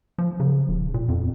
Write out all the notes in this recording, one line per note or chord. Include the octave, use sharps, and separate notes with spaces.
F3
C#3
D#1
A#2
F2